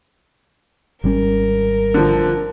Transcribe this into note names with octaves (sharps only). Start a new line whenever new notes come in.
G#1 G3 C#4 A#4
D3 F3